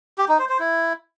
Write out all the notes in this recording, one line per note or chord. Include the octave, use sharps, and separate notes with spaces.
G4
D#4
C5
C5
E4